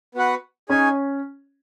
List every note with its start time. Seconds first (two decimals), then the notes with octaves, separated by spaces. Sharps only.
0.15 B3 F#4 B4 F#5
0.69 C#4 D#4 G#4 C#5 G#5